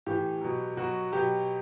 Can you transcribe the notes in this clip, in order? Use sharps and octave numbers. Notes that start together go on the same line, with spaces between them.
A2 E3 G4
B2 F#3
B2 F#3 F#4
B2 F#3 G4